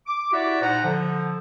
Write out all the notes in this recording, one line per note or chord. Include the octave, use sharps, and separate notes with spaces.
D6
E4 F#4 G4 D5 E5 F#5
A#2 D#4 C5 F#5 A#5
D3 F3